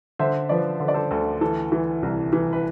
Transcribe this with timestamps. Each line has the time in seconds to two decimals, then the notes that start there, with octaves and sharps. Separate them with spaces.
0.19 D3 C5 E5
0.49 F3 B4 D5
0.80 D3 C5
0.88 D5
0.94 A4 C5
1.11 D2 A4
1.41 E3 A4
1.72 E3
2.03 C2
2.33 E3
2.53 B4